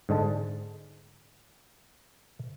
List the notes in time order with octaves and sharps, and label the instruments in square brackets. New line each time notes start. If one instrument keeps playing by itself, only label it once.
[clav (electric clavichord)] G#2 D3 G#3 A5